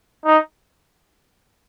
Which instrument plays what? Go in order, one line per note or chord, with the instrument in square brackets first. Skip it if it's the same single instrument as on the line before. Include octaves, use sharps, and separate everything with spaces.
[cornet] D#4